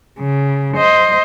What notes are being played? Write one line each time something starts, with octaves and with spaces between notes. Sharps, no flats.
C#3
C5 D#5